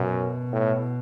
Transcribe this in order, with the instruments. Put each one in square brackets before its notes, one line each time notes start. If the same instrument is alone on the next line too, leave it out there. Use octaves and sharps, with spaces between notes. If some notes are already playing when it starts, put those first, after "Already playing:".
Already playing: [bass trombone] F#2 [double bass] B2
[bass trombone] A2